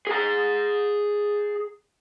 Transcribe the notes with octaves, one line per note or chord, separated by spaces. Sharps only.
G#4 A#5